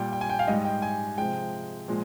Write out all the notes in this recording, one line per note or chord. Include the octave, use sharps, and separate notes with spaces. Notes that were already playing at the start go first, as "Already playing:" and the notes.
Already playing: A#2 G3 G5
G5
G#5
G5
F5
G#2 G3 D#5
G5
G#5
C3 F3 G#3 G5
A#2 F3 G#3